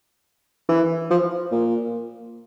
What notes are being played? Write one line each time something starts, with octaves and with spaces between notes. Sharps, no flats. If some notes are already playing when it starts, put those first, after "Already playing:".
E3
F3
A#2